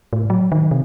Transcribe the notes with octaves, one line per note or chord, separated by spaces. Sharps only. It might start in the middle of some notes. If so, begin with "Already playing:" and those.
A2
F#3
D#3
C3